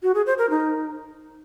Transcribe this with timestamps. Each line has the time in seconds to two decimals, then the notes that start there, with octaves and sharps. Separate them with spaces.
0.03 F#4
0.15 G#4
0.26 C5
0.38 A#4
0.50 D#4